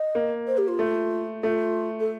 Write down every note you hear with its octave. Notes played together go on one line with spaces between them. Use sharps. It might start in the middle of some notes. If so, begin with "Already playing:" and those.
Already playing: D#5
A#3
C5
G4
F4
A3
A3 F4
A4